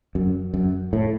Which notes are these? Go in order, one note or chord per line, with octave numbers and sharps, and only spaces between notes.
F#2
F#2
A2